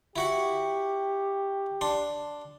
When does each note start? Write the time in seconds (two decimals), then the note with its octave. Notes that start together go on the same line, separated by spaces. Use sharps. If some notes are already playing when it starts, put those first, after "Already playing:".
0.16 E4 F#4 G4 F#5
1.81 D4 C6